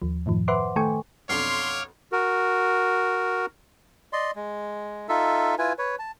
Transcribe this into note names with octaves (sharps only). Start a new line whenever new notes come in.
D#2 F3
F#2 A2 D#3 F3
B4 C5 E5 F#5 C6 D6
D#3 A3 A4 G5 G#5 C#6
B1 F2 D4 C#5 F5 C6 D6 F6
F#4 A#4
D5 D#5 C6
G#3
D#4 F4 A4 E5
E4 F4 B4 G#5
B4 C#5
A5